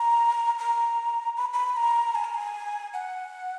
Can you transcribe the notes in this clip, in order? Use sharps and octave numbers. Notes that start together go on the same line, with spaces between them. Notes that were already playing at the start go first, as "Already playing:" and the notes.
Already playing: A#5
A#5
B5
B5
A#5
G#5
A#5
G#5
F#5